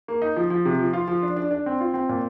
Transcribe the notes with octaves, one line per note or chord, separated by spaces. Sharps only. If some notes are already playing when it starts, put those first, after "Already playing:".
A#3
D#4
F3
F3
C3
F3
F4
F3
D4
D4
D4
C4
F4
C4
A#2